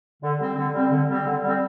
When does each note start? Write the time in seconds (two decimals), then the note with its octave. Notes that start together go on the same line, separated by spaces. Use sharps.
0.23 D3
0.39 G3 C4
0.57 D3
0.74 G3 C4
0.91 D3
1.09 G3 C4
1.26 D3
1.43 G3 C4